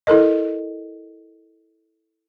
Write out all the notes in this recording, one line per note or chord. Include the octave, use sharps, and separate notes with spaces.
E4 A4 A#4 D#5